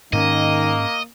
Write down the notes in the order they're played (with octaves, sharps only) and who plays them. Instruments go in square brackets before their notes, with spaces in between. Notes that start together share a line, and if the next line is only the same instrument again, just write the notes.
[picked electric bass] G#2 C4 C#4 [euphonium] D#3 [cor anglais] A#3 [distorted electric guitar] D#5